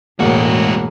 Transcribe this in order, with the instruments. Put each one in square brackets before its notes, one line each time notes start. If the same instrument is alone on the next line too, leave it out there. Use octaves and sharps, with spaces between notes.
[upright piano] E1 F#5 [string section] A2 [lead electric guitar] G#3 F#4 [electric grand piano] A#3